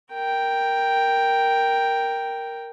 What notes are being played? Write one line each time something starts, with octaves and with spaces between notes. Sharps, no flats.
A#4 G5